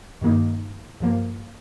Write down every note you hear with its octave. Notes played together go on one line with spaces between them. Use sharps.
G2 D#3 A#3 D#4
G2 F3 A#3